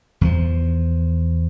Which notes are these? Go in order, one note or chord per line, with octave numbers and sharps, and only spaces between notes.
E2 F3